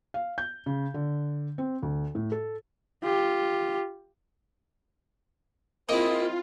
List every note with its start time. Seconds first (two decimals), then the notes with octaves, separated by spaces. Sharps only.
0.14 F5
0.38 G6
0.66 C#3
0.94 D3
1.58 C4
1.83 D2
2.15 A2
2.32 A4
3.04 F4 G4
5.89 G#3 A#3 C4 E4 F4 D#5